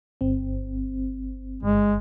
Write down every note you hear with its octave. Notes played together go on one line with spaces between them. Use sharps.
G1 C4
G1 G#3